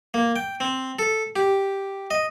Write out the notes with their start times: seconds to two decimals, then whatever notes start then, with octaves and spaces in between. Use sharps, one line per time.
0.14 A#3
0.36 G5
0.60 C4
0.99 A4
1.36 G4
2.11 D#5